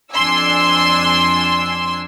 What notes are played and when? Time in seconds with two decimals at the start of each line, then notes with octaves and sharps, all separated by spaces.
0.14 F2 D4 G#5 C6 E6